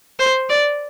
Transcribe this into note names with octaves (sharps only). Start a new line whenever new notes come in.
C5
D5